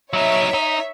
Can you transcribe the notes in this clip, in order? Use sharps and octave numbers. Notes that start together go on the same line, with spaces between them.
F#3 D#4 C#5 E5
D#4